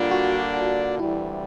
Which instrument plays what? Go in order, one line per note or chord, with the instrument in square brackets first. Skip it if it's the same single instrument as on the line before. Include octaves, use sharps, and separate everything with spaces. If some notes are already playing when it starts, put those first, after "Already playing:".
Already playing: [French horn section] D3 G3 A#3 D4 [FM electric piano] F4
[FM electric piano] F#4
[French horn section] D2 C3 E3 G3 [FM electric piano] E4